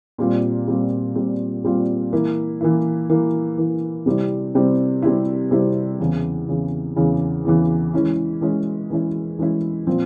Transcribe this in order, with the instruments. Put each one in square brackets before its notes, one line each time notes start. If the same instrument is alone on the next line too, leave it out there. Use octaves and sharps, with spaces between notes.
[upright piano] A#2 G3 C4 F4
A#2 G3 C4 F4
A#2 G3 C4 F4
A#2 G3 C4 F4
E3 A#3 E4
E3 A#3 E4
E3 A#3 E4
E3 A#3 E4
C3 G3 C4 E4
C3 G3 C4 E4
C3 G3 C4 E4
C3 G3 C4 E4
E2 C#3 E3
E2 C#3 E3
E2 C#3 E3
E2 C#3 E3
E3 G#3 C#4 E4
E3 G#3 C#4 E4
E3 G#3 C#4 E4
E3 G#3 C#4 E4
A#2 F3 C4